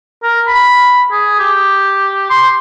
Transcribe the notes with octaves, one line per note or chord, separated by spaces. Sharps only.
A#4
B5
G#4
G4
C6